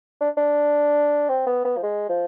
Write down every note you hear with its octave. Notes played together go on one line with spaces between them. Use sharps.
D4
D4
C4
B3
B3
F3
G#3
F3